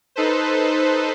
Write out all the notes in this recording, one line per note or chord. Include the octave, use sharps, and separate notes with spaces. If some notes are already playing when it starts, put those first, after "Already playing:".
D#4 A4 B4 C5